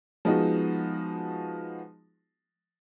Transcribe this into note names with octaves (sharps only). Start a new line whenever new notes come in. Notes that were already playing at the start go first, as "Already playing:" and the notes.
F3 G#3 B3 D#4 F#4